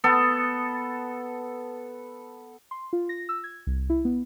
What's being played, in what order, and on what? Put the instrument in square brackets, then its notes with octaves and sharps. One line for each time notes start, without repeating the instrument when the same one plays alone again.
[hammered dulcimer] B3 A4
[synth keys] C6
F4
A#6
E6
G#6
C2
E4
B3